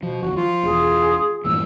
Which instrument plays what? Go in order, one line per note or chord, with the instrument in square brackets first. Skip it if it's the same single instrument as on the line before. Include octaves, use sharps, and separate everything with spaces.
[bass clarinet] B2 [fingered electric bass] F3
[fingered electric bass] F#1 E2 [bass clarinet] F#4
[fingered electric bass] F3 [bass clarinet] F4
[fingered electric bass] E1 [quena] G#4
[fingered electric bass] G2 A#2 E3 [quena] E6